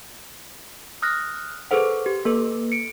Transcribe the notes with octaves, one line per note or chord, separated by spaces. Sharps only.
D#6 F6 F#6 A#6
G#4 A4 B4 C5 F#5
G4
A#3 A4 B4
C#7 D7